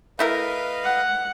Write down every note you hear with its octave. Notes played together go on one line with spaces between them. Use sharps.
A3 E4 A#4 B4 D#5 F5
F#5